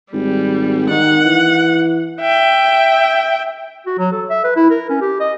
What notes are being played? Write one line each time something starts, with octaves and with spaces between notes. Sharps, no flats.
G#1 G3
D#3 F#5
E3
E5 G5
F#4
F#3
A4
E5
B4
E4
A#4
C#4
G4
D#5